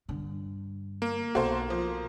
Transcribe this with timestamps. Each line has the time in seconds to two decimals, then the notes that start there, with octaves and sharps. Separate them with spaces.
0.08 G2 D3
1.02 A#3
1.35 B1 F#4 A4 C5
1.70 F3